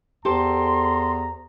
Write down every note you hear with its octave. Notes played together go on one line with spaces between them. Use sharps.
E2 G4 A4 C5 A#5 C6